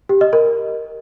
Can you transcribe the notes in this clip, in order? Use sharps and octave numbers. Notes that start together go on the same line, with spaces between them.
G4
D#5
A#4